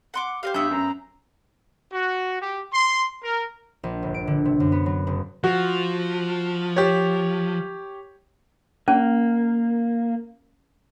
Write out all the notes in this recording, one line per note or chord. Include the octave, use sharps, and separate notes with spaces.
F#5 C6 D6
G4 C5 D#5 F5
G2 B3 E5 G6
F#2 A#5
F#4
G4
C6
A#4
A#1
G1
D7
D3
C3
F#2
B3
F#3
F#1
F3 F#4
G4 C#5
A#3 C#4